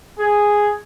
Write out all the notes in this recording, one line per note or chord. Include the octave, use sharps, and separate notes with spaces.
G#4